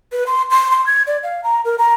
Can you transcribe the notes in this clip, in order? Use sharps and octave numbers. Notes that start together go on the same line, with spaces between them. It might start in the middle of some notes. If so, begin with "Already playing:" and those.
B4
C6
C6
C6
G#6
D5
F5
A#5
A#4
A#5